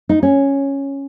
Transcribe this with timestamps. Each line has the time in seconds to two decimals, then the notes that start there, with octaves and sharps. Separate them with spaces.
0.09 D#4
0.23 C#4